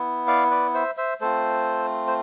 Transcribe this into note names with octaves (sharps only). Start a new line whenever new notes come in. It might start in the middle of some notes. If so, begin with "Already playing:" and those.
Already playing: B3 E4
D5 F5
B4 D5
C5 E5
C5 E5
A3 C4 F4 A4 C5
C5